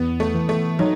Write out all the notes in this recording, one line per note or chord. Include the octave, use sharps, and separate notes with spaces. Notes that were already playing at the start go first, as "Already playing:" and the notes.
Already playing: E2 B3
A3
E3
A3
F#3 D#4